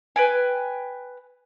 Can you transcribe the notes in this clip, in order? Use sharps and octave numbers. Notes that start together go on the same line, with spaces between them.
B4 G5 G#5